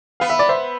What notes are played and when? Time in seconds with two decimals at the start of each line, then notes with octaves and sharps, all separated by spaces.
0.20 B3 F5
0.30 E5
0.39 D5
0.49 C5 E5